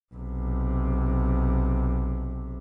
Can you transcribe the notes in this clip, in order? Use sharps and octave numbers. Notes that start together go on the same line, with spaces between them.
B1 C3